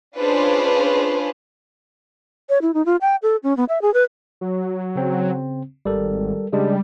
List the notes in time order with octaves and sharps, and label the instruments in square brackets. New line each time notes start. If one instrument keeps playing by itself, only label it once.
[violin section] C#4 D4 F4 G#4 B4 C5
[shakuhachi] C#5
E4
D#4
F4
G5
A4
C#4
B3
E5
G#4
B4
[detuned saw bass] F#3
[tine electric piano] C#3 C4
[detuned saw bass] G#1 [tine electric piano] G3 A4 A#4
[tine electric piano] C#3 G#3 D4 [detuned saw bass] G3